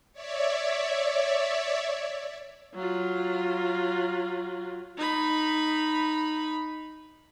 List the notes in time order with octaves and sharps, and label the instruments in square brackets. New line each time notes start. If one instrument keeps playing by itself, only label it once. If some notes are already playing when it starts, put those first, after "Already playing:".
[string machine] C#5 D5 E5
[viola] F#3 F4
D#4 B5